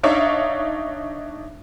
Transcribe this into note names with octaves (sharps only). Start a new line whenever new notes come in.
D4 D#4 C#5 E5 F5